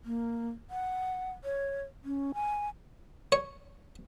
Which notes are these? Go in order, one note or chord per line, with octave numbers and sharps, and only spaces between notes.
A#3
F#5
C#5
C#4
G#5
C#5